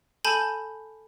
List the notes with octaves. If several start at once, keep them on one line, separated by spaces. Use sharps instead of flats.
A4 G#5 A5 B5 G6